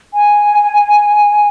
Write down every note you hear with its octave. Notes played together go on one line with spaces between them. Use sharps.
G#5